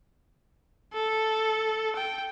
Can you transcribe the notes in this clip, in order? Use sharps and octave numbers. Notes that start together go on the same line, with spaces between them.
A4
G5